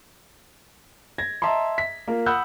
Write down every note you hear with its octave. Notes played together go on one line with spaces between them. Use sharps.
G#6 A#6
D#5 E5 A5 A#5 C6
B6
A#3 F4 A#4
F#5 B5 D#6 E6 F#6 G6